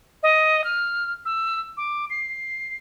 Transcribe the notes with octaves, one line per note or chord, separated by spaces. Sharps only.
D#5
F6
E6
D6
C7